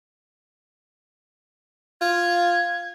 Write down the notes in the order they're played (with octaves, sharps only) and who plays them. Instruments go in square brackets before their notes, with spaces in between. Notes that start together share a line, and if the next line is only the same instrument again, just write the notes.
[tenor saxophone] F4 [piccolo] G#6